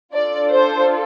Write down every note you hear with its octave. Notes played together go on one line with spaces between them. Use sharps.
D4 F4 A4 D5
C5